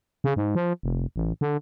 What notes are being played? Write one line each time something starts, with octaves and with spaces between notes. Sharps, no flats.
C#3
G#2
F3
F1
A1
D3